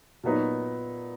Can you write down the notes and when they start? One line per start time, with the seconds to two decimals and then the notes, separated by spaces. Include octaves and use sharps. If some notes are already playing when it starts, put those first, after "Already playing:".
0.24 A#2 F#3 B3 D#4